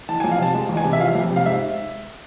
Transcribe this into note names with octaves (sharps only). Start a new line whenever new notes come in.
E3 A5
F2 G#5
F5
C3 A5
G#3 A5
E2
G#5
C3
E5
F3 F5
F2
C3
F5
G#2 E5